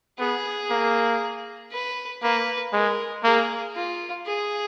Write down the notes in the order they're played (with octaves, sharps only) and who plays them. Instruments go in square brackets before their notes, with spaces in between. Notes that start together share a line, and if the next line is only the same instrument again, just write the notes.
[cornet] B3 [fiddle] G#4
[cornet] A#3
[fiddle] B4
[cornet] A#3 [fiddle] B4
[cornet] G#3 [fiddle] A#4
[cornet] A#3 [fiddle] G#4
[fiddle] F4
G#4